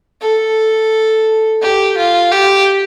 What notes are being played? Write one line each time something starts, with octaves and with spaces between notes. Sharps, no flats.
A4
G4
F4
G4